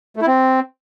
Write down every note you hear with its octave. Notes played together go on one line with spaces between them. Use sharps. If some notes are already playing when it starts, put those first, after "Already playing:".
A3
E4
C4